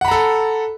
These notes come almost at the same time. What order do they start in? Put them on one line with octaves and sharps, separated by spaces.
F#5 B5 A#5 A4